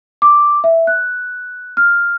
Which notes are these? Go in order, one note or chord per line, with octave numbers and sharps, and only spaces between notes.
D6
E5
F#6
F6